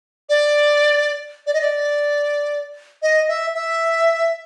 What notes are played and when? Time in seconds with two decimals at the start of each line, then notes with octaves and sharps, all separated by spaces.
0.29 D5
1.47 D5
1.54 D#5
1.61 D5
3.02 D#5
3.28 E5
3.54 E5